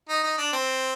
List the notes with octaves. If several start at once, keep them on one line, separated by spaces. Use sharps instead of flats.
D#4
D#4
D4
C4